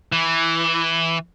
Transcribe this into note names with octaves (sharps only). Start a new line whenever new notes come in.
E3